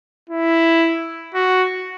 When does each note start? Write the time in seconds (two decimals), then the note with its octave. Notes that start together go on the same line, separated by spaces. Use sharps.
0.30 E4
1.35 F#4